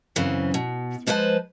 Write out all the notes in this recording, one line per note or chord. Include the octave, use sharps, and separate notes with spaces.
F#2 C#3 E3 C4
B2
F3 G#3 E4 B4 C5 A5